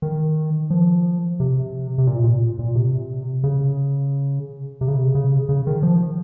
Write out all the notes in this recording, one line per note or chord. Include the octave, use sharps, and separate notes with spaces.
D#3
F3
C3
C3
A#2
A#2
A#2
C3
C#3
C3
C#3
C3
C#3
C#3
D#3
F3